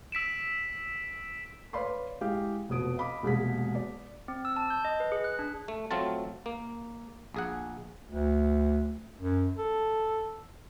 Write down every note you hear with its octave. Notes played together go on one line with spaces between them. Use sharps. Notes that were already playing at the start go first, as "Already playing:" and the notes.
E6 B6 D7 E7
B4 C#5 D5 F5 B5 C6
G#3 E4 G4 F5
F1 B2 D#6 D7
D#5 F5 B5 D6
E1 C2 G#3 A#3 G#4 B6
D5
C4
E6
A5
G6
D#5
B4
G#4
F#6
D4
A3
F#3 A3 C4 F4 A5
A#3
A#1 G#4 F#5
D2
F#2
A4